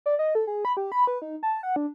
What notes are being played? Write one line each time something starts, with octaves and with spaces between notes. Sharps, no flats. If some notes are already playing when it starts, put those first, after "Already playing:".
D5
D#5
A4
G#4
B5
G4
B5
B4
D#4
A5
F#5
D4